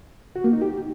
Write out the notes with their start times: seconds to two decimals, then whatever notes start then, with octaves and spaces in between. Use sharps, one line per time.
0.36 F#4
0.44 A#3
0.53 D#4
0.62 G4